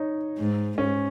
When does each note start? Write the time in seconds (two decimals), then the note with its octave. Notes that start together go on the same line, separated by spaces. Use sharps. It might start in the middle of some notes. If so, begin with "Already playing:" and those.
Already playing: D#4 C#5
0.38 G#2
0.78 G#2 C#4